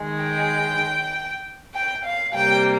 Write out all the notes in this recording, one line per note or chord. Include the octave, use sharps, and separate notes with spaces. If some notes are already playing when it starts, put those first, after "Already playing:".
Already playing: D#3 G#3
G5
G5
F5
C3 G3 A#3 G5